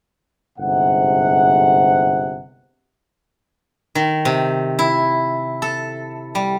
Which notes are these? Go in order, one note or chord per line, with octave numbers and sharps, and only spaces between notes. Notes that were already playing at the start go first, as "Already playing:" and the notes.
G1 G#2 C3 F#5
D#3
C3
E4
A4
G3